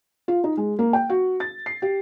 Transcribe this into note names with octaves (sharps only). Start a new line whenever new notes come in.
F4
D#4
G#3
A#3
G5
F#4
A6
C7
G4